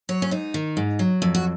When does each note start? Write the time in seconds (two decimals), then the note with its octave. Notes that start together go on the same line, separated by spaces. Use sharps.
0.09 F#3 C#5
0.22 C#4
0.31 G#2 D#4
0.54 D#3
0.77 G#2
0.99 F#3
1.22 F2
1.35 F#4